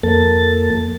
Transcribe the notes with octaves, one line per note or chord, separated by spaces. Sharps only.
F2 A#3 A4 A6